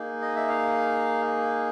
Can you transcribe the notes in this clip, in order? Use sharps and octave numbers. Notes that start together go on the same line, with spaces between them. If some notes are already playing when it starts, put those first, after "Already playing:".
Already playing: A#3 D#4 G#4
D#5
E5
F5